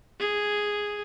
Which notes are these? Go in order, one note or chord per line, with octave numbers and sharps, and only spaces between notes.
G#4